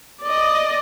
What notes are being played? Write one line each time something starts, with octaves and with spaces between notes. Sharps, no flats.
D5 D#5